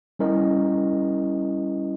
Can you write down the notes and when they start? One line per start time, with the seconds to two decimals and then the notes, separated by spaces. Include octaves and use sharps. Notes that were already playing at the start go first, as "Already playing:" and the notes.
0.19 G3 C#4 E4 A#4 D#5